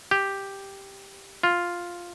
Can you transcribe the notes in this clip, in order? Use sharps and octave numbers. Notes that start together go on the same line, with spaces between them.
G4
F4